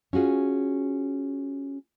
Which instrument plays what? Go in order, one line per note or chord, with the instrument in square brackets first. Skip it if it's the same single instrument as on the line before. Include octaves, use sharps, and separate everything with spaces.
[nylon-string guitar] C#4 F4 F#4 G#4